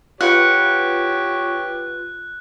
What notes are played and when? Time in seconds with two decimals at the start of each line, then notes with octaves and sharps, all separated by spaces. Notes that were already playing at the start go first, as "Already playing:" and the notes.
0.21 F4 G4 B4 C#5 F#5 F#6